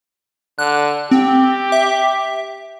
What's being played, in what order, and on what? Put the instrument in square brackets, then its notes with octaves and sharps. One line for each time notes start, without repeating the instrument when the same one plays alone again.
[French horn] D3 [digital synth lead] F#6
[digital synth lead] C4 [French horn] G4
[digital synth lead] E5